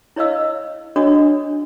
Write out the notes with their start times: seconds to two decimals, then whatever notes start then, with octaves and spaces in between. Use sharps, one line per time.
0.16 E4 C#5 D#5 F5 E6
0.96 D4 F#4 C#5 D#5 F#5 D#6